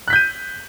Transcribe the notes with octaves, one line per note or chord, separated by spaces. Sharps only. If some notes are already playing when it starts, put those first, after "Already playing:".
F#6 G6 B6 D#7